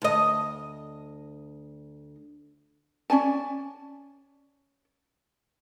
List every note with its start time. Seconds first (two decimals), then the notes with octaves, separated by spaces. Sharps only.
0.02 D2 D#5
3.10 C#4 D5 G#5 A5